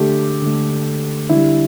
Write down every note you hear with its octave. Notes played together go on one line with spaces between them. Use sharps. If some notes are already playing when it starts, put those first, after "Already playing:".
Already playing: D3 A3 G4 A4
D3 A3
D3 G3 E4